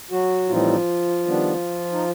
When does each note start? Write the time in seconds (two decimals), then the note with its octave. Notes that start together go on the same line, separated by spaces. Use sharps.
0.11 F#3 F#4
0.49 A2 E3 F3 G3 C4 D#4 F4
1.26 D#3 G3 B3 D4
1.92 D#4